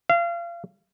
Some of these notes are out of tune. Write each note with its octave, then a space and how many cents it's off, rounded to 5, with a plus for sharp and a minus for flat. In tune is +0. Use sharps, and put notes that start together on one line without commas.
F5 -30